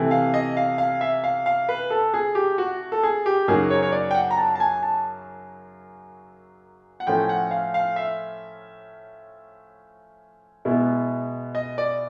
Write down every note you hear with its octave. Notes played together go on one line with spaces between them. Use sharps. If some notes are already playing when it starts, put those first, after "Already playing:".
Already playing: C3 E3 A3
F5
D#5
F5
F5
E5
F5
F5
B4
A4
G#4
G4
F#4
A4
G#4
G4
F#2 C#3 F#3 A#3 D#4 G#4
C#5
C#5
D5
G5
F#5
A#5
A5
A5
G#5
A5
F#5
A2 F3 A3 C#4 G5
F#5
F5
F5
E5
B2 G#3 B3 E4
D#5
D5